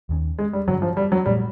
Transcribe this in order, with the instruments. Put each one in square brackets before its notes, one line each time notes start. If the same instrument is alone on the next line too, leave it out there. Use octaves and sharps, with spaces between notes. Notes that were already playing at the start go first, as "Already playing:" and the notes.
[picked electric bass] D#2 D#3 G#3 C#4
[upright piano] G#3
G3
[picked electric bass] G2 D3 G3 [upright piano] F#3
[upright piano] F3
G3
F#3
[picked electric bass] A#2 F3 A3 [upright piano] G3